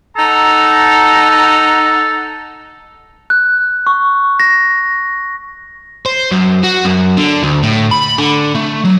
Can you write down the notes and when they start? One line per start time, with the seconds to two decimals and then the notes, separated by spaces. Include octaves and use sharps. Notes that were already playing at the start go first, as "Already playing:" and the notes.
0.17 D#4 A4 F#5 A#5
3.30 F#6
3.87 C#6
4.40 A#6
6.06 C5
6.32 F#2
6.64 F#4
6.85 F#2
7.17 D3
7.43 D2
7.63 A2
7.91 B5
8.18 D3
8.55 A3
8.85 F#3